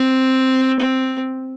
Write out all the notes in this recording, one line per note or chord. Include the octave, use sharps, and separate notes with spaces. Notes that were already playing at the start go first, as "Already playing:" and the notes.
Already playing: C4
C4